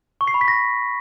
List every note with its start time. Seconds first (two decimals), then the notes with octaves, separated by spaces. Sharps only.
0.21 C#6
0.27 C7
0.34 B5
0.41 B6
0.48 A#6